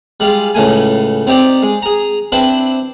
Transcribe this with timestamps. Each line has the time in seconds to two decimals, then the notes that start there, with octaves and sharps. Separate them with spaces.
0.20 G3 G#3 F4
0.54 C#2 A2 A3 G#5
1.27 C4 D#4 G4 D5
1.63 G#3
1.82 G#4 A#5
2.32 C4 D4 E4 B4